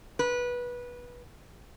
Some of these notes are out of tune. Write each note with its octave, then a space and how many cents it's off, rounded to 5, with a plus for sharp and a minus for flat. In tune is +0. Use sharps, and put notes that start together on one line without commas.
B4 -20